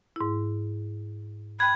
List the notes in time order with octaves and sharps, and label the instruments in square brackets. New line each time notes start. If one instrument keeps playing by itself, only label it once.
[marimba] G#2 E4
[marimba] G5 F#6 [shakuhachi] B5 [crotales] G#6